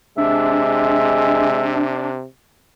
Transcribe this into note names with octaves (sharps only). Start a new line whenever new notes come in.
C3 G#3 D4 E5